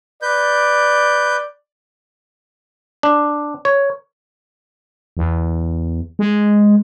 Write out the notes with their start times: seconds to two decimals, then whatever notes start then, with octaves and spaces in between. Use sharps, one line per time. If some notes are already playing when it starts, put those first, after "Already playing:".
0.22 B4 D5 G6
3.03 D4
3.65 C#5
5.17 E2
6.19 G#3